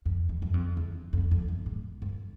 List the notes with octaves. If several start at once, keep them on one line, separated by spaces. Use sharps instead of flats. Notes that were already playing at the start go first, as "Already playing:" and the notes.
F2
E2
F#2
F2
E2
F2
F2
F#2
G#2
G2